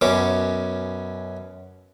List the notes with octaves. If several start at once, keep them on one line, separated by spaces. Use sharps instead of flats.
F#2 B2 C#4 D6